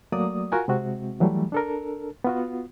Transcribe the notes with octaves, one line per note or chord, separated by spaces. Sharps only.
F#3 A3 A#3 F#4 D5 D#6
F4 F#4 A#4 F#5 G#5
C3 G#3 C4 F#4
E3 F#3 G3 A3
D4 A4 A#4
B3 F4 F#4